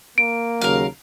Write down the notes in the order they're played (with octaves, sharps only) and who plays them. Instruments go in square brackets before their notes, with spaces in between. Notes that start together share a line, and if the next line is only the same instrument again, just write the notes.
[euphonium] A#3 [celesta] D7
[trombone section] D#2 C#3 F#3 [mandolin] A#4 F5